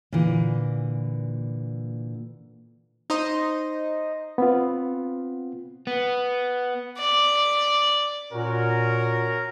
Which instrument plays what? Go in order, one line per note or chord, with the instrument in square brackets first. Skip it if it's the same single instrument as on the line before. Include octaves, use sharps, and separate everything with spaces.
[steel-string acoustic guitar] A#2 D3 E3
[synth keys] D#4 C5 D#5
[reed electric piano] B3 C4 F4
[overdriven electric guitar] B3
[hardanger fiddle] D5
[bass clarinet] A#2 [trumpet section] C#4 F#4 A#4